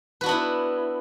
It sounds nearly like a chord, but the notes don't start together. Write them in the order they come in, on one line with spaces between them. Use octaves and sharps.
B4 F#4 D4 B3 E4